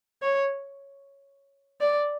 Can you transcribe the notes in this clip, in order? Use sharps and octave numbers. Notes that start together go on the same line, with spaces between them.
C#5
D5